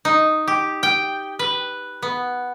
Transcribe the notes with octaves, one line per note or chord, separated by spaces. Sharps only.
D#4
G4
G5
B4
B3